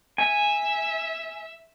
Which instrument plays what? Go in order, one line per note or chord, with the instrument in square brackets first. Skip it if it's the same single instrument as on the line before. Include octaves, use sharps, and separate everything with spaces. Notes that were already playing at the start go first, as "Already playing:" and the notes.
[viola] E5 [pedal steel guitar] G#5